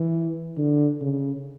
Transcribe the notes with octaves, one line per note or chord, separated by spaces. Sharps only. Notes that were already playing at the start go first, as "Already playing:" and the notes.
Already playing: E3
D3
C#3